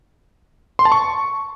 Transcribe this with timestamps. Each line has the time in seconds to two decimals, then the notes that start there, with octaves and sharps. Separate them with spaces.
0.79 C6
0.85 A5
0.92 C#6